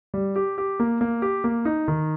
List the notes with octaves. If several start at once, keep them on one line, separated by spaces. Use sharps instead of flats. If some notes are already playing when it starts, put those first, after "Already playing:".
G3
G4
G4
A#3
A#3
G4
A#3
D#4
D#3